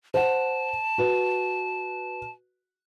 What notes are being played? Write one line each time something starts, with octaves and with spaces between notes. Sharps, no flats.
C5 F#5 A5
F#4 B4